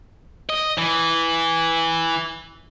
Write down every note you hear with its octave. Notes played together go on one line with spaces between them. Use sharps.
D#5
E3